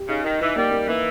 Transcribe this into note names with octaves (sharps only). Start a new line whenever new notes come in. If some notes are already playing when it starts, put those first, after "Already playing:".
Already playing: G4
C#3 D#4
D#3 D#4
E3 D#4
G3 A#3
A#3
E3 A#3